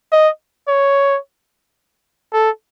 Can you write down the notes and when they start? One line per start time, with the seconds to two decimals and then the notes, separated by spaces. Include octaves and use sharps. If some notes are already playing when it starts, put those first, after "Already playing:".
0.12 D#5
0.68 C#5
2.33 A4